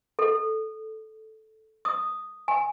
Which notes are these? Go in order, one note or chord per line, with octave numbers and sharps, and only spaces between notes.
A4
D#6
G#5